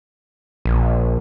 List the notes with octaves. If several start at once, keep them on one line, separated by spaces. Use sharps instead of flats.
A#1